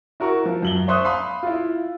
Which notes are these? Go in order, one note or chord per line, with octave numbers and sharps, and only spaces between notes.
E4 F#4 A#4 C#6
F3
F#2 F#7 G7
C5 E5 C6 C#6 D#6 F#6
F5 B5 C6 D#6
E4 F4